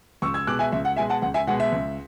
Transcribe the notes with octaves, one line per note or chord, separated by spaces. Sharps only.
C#2 C#6 E6
E6 G#6
B2 G#3 D6 F#6
E5 G#5
C#2 E5
F#5
B2 G#3 E5 G#5
F#5 A5
C#2 F#5
E5 G#5
B2 G#3 F#5
E5
C#2